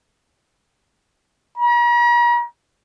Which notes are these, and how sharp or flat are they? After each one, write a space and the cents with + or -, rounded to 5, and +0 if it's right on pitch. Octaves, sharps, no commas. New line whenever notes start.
A#5 +45